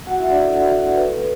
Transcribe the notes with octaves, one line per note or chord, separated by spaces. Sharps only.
A3 F#4 F#5
E4 E5
D4 F#4 D5
A4
A3 F#4
D4 F#4
B4
A3 A4